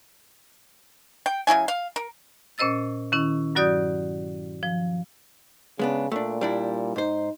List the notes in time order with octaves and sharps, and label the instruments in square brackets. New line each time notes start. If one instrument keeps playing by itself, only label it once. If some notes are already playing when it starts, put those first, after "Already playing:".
[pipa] G5
C#3 F#3 E4 G#5
F5
A#4
[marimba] A#2 C#4 C5 D#5 E6 A6
D#3 C#4 E4
G2 F#3 F#4 D5 D#6 G6
F3
[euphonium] C#3 [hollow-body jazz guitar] G#3 B3 D4
[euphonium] A#2 [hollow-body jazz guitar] A3 D4
[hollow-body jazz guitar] G3 D4 E4
[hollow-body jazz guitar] G#2 C5 [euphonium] D#4